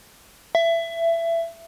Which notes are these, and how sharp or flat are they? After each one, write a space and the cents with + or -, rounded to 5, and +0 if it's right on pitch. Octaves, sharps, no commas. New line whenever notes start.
E5 +20